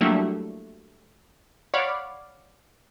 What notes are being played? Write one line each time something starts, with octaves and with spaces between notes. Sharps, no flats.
F#3 G3 A3 A#3 D4 E4
C#5 D5 F5 F#5 B5 D6